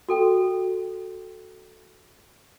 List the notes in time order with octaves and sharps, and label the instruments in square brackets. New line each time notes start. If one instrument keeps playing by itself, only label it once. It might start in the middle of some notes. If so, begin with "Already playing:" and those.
[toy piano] F#4 A4 G5